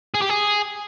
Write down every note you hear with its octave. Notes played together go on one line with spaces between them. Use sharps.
G#4
G4
G#4